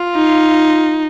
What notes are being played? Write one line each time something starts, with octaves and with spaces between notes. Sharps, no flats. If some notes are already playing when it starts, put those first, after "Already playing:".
Already playing: F4
D#4